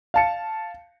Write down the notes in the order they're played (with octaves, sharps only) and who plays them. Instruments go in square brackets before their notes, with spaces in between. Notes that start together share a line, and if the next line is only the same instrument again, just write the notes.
[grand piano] F5 A5 C#7